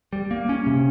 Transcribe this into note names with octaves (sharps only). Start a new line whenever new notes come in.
G3
A#3
C#4
C3